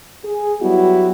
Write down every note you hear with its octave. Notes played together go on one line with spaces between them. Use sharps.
G#4
F#3 G3 B3 E4 F#4